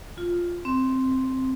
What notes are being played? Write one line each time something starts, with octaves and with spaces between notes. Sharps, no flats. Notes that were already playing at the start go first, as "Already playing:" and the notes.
F4
C4